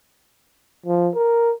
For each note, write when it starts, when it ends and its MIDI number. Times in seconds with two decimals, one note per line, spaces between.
0.86 1.10 53
1.15 1.53 70